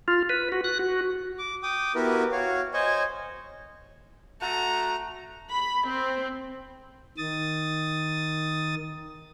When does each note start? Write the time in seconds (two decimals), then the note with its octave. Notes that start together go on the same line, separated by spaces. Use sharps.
0.08 F4
0.29 B4
0.52 F#4
0.64 F#6
0.79 F#4
1.39 D6
1.63 G5 D6 D#6
1.95 B3 E4 F#4 G4 A#4 B4
2.32 F#4 C#5 F5
2.74 C5 C#5 D#5 G#5 C#6
4.42 A3 F#4 A#5
5.50 B5
5.89 C4
7.17 D#3 D#6 A6